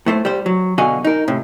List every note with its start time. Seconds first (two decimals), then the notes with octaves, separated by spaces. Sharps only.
0.06 A2 A3 C5
0.25 G3 C5
0.46 F#3
0.78 B2 D3 F#4 D#5 F5 G#5
1.05 D#4 A#4
1.28 A2 C3